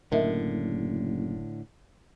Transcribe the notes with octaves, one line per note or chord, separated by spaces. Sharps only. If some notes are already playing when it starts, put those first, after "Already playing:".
F#1 A2 D3 A#4 D#5 E5